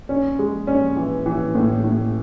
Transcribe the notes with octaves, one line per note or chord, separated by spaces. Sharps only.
C#4
G#3
C#4
E3
E3
A2
A2